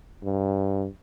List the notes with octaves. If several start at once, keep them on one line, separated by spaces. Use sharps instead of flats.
G2